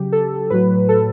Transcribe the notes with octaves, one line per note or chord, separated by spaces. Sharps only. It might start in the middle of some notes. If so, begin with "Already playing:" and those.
Already playing: C#3 F#3 G4
A4
A2 F#3 B4
A4